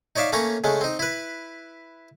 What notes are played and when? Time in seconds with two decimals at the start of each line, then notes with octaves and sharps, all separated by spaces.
0.16 D#4 C#5 D5 E5 F5
0.32 A3 A#3 C#4 C#5 A#5
0.64 C#3 G#3 A3
0.81 C4 D#4
0.99 E4 B4